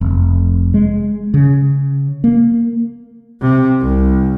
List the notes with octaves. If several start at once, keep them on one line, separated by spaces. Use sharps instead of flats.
F1
G#3
C#3
A#3
C3
C2